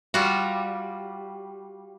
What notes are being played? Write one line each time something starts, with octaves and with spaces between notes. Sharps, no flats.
G3 F4 F#4